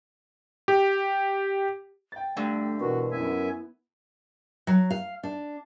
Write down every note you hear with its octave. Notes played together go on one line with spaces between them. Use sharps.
G4
G5 A6
G2 D3 A3
B2 E3 F#4 A#4 B4
F#2 B3 E4 E5 G#5
F#3
F5
D4